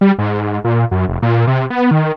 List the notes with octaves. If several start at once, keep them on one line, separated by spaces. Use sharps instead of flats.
G3
G#2
A#2
F#2
F1
A#2
C3
B3
D#3